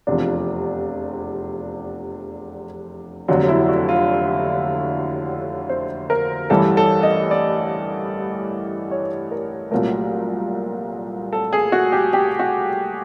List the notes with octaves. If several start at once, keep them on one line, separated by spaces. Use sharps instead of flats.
F1 E2 C3 F3 D4
F1 D#2 D3 F#3
E4
F#4
F4
C5
A#4
A1 G2 E3 G3 A4
A4
D#5
D5
C#5
A#4
C2 A#2 F#3 A3 A#4
A4
G#4
F#4
G4
G4
F#4